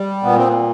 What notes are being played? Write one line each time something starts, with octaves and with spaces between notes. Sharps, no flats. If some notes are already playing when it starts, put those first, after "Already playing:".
Already playing: G3
A#2 B3
C4
B3